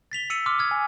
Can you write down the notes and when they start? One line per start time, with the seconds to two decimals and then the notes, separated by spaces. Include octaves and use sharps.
0.11 A6 B6 F7 G7
0.30 E6 C#7 D#7 F#7
0.46 C6 D6 F6
0.58 D#6 F6 G#6
0.71 G#5